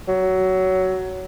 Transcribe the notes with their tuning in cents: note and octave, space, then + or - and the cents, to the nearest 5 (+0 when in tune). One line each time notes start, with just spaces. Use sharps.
F#3 +15